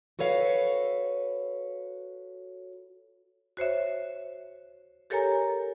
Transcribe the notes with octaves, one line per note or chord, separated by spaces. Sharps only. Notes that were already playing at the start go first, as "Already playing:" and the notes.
F#4 A4 B4 C#5 F5
F#4 C5 C#5 E5
G4 A4 A#4 C#5 G#5 A#5